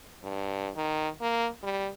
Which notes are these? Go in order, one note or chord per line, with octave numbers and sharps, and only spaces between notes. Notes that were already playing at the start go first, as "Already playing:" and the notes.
G2
D#3
A#3
G3